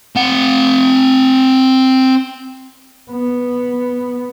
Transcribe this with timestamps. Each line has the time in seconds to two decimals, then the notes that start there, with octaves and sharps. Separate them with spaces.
0.16 C4 F#5
3.11 B3